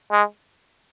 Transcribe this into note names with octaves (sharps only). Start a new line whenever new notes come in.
G#3